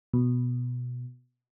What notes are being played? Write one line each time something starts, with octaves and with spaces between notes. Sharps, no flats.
B2